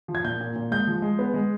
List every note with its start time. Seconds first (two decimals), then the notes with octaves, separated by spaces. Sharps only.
0.08 F3
0.15 G#6
0.24 A#2 G6
0.41 A#2
0.56 A#2
0.71 G#3 G6
0.87 F3
1.02 G#3
1.19 B3
1.34 G#3